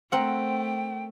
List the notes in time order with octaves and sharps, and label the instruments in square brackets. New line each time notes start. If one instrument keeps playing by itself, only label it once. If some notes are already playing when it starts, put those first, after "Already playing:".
[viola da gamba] A3 [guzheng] C4 A#4 F#5 [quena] G5